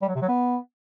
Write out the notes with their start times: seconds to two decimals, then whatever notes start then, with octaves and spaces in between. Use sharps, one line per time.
0.02 G3
0.09 F#3
0.15 C3
0.22 F#3
0.28 B3